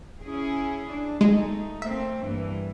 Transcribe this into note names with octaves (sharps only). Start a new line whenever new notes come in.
C#4 E4 G#4
D4
G#3 A3 D#4
A3 A#3 C4 E5
G2 E3 A#3